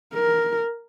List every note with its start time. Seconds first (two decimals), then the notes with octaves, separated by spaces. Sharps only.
0.14 A#4